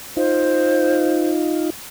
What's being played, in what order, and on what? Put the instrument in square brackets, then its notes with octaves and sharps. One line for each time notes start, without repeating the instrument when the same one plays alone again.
[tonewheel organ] D#4 F4 [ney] C5